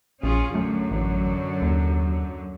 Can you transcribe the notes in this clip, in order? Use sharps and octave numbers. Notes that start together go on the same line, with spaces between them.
A#1 C#4 F4 G#4
F#2 D3 F#3 A3
A1
D#2